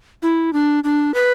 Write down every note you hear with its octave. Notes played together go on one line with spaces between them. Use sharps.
E4
D4
D4
B4